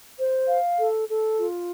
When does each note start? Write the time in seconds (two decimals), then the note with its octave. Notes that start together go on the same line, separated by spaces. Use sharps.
0.19 C5
0.48 F5
0.79 A4
1.09 A4
1.38 F4